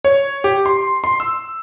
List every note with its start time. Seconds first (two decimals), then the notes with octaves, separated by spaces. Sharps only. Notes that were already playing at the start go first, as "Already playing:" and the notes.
0.05 C#5
0.44 G4
0.66 C6
1.04 C6
1.20 E6